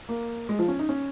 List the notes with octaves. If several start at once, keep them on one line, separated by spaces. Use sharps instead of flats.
A#3
G#3
F3
C#4
D#4
C#4